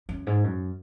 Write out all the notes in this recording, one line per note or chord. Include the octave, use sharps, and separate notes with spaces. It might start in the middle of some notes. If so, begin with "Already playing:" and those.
F#2
G#2
F#2